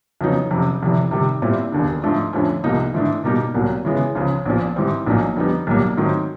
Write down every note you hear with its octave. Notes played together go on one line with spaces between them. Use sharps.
F2 C#3 F#3 B3 D#4
F#1 F2 C3
F1 F2 C3 E3
C3 D#3 G3
A#2 G3 C4 E4
E1 D#2 D3
G#2 F3 A3 D4 F4
F2 D3 F3 A3 C#4
C2 C3 F3 A#3 D#4
G#2 E3 A3 D4
B2 G3 A#3 D#4 G4
C2 A#2 F#3
C#3 E3 G#3 B3
C#2 C#3 F3
A#1 A#2 F3
G#2 E3 G3 C4
A#1 A#2 F#3 A#3 D#4
F2 D3 G3 B3 D#4
B1 A#2 G3 A#3
G#2 D#3 F#3 A3 C4